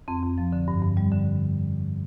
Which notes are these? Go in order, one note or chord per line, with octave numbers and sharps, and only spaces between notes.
F2 C4
F2
F3
D3
G2
G2
G3
D3